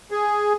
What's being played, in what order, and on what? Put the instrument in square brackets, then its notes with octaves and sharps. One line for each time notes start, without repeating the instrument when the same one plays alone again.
[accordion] G#4